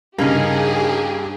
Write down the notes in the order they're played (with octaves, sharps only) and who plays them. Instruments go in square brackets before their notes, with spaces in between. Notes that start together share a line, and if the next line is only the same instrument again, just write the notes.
[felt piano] G2 C#3 [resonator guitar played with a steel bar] A#3 C#4 D#4 [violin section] G4 G#4